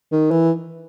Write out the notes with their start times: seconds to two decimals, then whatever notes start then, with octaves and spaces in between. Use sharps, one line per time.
0.12 D#3
0.31 E3